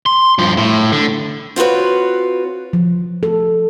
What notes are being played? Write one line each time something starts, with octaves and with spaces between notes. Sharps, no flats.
C6
G2 F3
A2
D3
C4 F4 F#4 B4 C#5
F3
A4